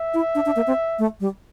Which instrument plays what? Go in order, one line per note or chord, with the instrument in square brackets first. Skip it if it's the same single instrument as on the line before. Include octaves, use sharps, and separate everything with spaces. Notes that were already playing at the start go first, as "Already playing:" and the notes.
Already playing: [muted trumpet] E5
[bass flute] E4
D4
D4
A#3
C4
A3
G3